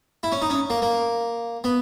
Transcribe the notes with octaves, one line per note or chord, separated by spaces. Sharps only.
E4
C#4
D#4
C#4
A#3
A#3
B3